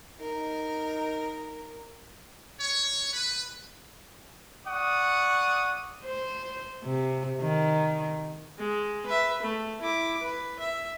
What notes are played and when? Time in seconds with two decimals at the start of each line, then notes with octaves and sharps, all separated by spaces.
0.20 D#4 A#4
2.59 C#5
3.13 B4
4.66 D5 F#5 C#6 D#6
6.04 C5
6.83 C3
7.41 D#3
8.58 G#3
9.06 B4 E5
9.43 A3
9.82 E4 D6
10.22 B4
10.59 E5